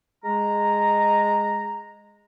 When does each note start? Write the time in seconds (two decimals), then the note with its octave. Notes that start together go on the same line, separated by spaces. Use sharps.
0.24 G#3 A#5